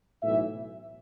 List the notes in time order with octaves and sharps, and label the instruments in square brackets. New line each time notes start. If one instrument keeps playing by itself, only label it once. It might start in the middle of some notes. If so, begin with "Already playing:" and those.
[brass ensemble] B1 A2 E3 E5